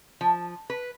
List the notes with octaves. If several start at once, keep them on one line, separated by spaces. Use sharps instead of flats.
F3
B4